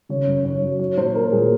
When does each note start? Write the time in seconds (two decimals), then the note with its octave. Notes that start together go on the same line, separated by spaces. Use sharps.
0.09 C#3 C#5
0.27 F#2
0.45 F#2 C#5
0.62 F#3
0.79 F#3 C#5
0.97 A#2 C5
1.15 F#3 A#4
1.32 A#2 G#4